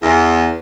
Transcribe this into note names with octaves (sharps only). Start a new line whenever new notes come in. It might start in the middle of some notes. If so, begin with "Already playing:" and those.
E2